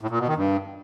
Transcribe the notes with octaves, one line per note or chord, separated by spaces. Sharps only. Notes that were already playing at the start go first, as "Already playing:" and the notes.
A2
A#2
B2
D#3
G2